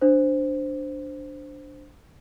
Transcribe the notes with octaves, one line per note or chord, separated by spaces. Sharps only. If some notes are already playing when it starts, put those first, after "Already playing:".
D4 C5